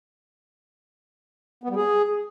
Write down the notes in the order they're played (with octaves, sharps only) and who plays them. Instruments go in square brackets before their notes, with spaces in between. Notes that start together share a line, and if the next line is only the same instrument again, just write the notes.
[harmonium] B3
G3
G#4